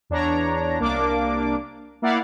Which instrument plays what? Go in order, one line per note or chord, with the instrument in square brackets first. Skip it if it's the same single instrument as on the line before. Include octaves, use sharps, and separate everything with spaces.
[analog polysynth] E2 D4 C#5 A#5
C2 A#3 D4 D6
A#3 E4 D5 F5 F#5